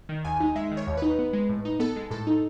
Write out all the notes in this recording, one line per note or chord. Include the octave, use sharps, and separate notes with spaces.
D#3
D#2 G#5
D#4
G#3 E5
D#3
C#5
D#2
D#4 B4
B3
G#3
A2
D#4
B3 A4
G#3
A2 A4
D#4